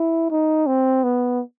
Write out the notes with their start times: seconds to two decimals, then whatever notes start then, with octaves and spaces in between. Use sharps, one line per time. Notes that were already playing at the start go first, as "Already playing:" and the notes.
Already playing: E4
0.31 D#4
0.67 C4
1.03 B3